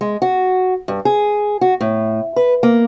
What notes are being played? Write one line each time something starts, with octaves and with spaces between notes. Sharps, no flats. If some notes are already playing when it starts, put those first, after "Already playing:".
G#3
F#4
G2
G#4
F#4
A2
B4
A#3